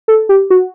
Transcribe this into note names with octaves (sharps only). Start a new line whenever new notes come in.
A4
G4
F#4